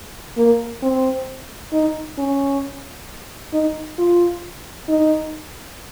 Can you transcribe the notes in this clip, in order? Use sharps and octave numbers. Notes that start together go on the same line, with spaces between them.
A#3
C4
D#4
C#4
D#4
F4
D#4